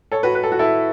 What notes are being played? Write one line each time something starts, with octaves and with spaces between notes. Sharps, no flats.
A4 C#5
F#4 B4
B4
A4
F#4
E4 A4